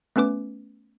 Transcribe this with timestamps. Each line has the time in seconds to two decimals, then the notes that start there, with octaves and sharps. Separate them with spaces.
0.16 A3 B3 C#4 B4 D6